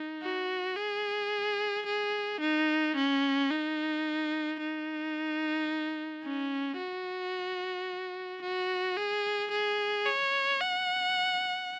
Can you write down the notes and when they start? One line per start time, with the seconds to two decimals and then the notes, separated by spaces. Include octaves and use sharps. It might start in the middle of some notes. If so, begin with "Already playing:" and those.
Already playing: D#4
0.23 F#4
0.76 G#4
1.86 G#4
2.40 D#4
2.96 C#4
3.51 D#4
4.60 D#4
6.23 C#4
6.78 F#4
8.42 F#4
8.97 G#4
9.51 G#4
10.06 C#5
10.61 F#5